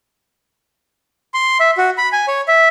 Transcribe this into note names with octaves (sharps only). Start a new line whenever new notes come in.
C6
E5
F#4
B5
G#5
C#5
E5